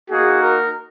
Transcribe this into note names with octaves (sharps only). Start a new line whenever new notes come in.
A#3 D#4 F#4 G#4
A#4